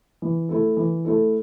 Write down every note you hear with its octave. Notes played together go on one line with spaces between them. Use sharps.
E3
A3 E4 A4
E3
A3 E4 A4